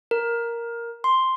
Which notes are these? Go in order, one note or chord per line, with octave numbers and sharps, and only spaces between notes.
A#4
C6